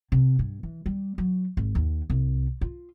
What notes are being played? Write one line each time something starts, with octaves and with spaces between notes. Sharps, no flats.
C3
G2
E3
G3
F#3
G#1
D#2
C2
F4